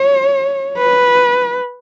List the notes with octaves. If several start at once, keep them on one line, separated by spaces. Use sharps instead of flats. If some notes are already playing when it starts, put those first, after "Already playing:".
Already playing: C#5
B4